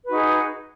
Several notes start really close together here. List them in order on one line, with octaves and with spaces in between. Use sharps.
B4 F#4 D#4 G#4